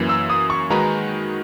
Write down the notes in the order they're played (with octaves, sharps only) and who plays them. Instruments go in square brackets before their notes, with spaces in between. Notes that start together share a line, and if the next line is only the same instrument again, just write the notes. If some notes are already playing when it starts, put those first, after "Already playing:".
Already playing: [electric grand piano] F#2 E3 A#3
[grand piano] E6
D#6
C#6
[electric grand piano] D#3 G#3 D#4 F#4 B4 [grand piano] A#5